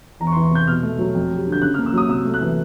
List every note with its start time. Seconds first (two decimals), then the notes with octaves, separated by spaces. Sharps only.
0.20 E2 A#5
0.27 C#6
0.32 C6
0.36 E3
0.44 C#6
0.51 C3 G6
0.67 B2 F6
0.83 A3
0.99 F#3
1.15 F2
1.31 G3
1.47 D3
1.52 G6
1.62 C#3 F#6
1.74 F6
1.78 A#3
1.86 E6
1.93 F#3 D#6
2.09 C3 E6
2.25 A3
2.34 F#6
2.41 E3